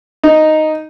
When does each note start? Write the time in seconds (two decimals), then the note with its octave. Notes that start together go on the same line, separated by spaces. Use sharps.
0.23 D#4